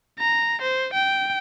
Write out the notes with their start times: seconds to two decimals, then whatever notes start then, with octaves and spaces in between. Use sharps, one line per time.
0.19 A#5
0.62 C5
0.94 G5